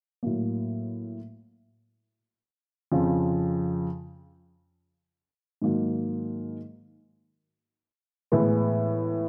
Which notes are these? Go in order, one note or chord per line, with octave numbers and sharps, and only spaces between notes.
A2 F#3 A#3
F2 C#3 F3
G#2 D#3 F#3 A#3
A2 E3 G#3 B3